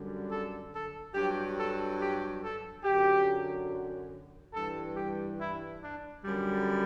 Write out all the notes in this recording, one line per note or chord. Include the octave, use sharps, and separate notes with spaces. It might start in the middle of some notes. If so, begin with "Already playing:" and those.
Already playing: F#2 D3 G3
A4
A4
G2 F#3 G4
A4
G4
A4
F#2 D3 F#3 G4
G2 E3 G3 A4
G4
E4
D4
F#2 D3 G3